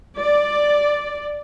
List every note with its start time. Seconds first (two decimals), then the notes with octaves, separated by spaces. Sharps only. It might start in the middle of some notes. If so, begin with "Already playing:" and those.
0.18 D5